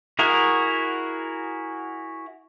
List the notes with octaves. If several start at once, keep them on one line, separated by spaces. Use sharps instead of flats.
E4 F#4 G#4 A#4